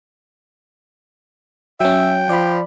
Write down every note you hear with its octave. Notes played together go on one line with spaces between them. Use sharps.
F#3 C#4 E5 G5
F3 D5 B5